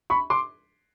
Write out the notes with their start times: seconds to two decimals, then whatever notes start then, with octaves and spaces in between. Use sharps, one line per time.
0.10 B5 C#6
0.30 C6 D6